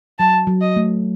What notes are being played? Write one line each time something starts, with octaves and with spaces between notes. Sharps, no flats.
F#3 A5
F#3
D#5
A3